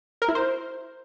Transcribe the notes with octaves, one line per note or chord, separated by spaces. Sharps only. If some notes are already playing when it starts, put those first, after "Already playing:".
A#4
E4
C5